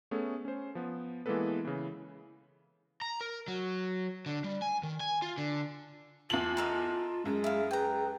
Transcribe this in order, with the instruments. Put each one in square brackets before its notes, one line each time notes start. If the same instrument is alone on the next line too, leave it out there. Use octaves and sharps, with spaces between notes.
[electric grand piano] A3 B3 C#4 G#4 A4
C#4 C5
F3 B3
E3 G#3 A#3 B3 A4 B4
C#3 E3
[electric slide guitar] A#5
A#4
F#3
D3
G3
G#5
D#3
G#5
F4
D3
[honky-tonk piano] E2 F#7 [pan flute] F4 [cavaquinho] A5
[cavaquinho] D#4 A4 A#4
[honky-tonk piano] F#2 [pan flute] G#3 [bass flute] G#4
[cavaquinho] E4 F5
[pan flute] B4 [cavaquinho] G5 A#5